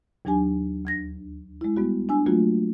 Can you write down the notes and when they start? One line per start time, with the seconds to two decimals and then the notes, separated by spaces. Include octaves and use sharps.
0.25 D#2 E3 F#3 D4 G4 G#5
0.85 D2 G#6 A#6
1.61 G#3 E4
1.77 G3 B3 F#4
2.09 D4 G#5 E6
2.26 E3 F#3 A3 A#3 F4 F#4